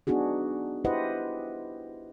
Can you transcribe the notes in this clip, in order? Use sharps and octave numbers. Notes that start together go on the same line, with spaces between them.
B3 D4 D#4 F#4 G#4
E4 G4 B4 C5 D#5 F#5